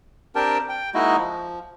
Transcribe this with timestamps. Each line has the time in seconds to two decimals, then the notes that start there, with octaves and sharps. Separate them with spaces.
0.36 C4 D4 G4 A#4 G5 A5
0.69 G5
0.95 G#3 A#3 D#4 E4 F#4 D#5
1.18 F3